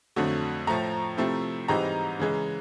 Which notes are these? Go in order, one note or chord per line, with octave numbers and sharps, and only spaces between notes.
F2 D3 F#3 A3
A2 F3 A3 A#5
C3 F3 A3 C4 E4
G#2 E3 G3 C4 D#4 A#5
C#3 E3 G#3